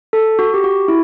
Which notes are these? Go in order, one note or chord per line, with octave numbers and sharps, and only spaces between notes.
A4
F#4
G4
F#4
E4